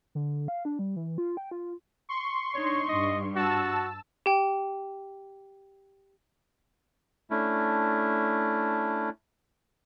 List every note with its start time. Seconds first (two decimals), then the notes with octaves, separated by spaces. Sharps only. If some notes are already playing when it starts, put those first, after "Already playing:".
0.15 D3
0.48 F5
0.65 D4
0.79 G3
0.96 E3
1.18 F4
1.37 G5
1.51 F4
2.09 C6 C#6
2.54 D4 D#4 C#5
2.88 G2 D#5
3.36 F#4 A5 E6
4.26 G4 G5
7.30 A3 C#4 D4 E4